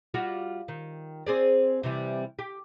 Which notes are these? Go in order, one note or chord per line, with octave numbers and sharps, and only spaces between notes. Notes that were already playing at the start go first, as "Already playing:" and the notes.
G3 F4 F#4
D#3
C4 G#4 D5
C3 E3 G3
G4